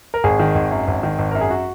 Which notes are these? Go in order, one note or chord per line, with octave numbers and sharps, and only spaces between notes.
A#4
G#1 G#4
D#3
G#1
F#2
G#1
D#3
G#1
F#2 A#4
G#4
F#4